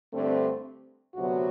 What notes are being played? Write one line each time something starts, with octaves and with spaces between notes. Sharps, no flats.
G2 D3 A3 C4
D2 C3 F#3 B3 F#4